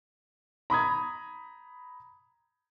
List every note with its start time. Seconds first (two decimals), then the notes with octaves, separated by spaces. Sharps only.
0.70 A#5 B5 D#6 G#6